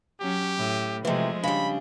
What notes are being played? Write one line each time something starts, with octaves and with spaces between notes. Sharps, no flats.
F#3 C#4 G4
A2
C3 E3 F3 G#3 A3
C#3 G3 D4 B5